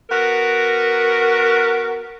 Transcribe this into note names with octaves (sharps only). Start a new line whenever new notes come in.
B3 F#4 A#4